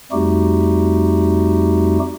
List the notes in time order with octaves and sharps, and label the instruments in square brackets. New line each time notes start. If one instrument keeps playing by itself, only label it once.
[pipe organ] F2 G3 A3 D#4 F#4 G4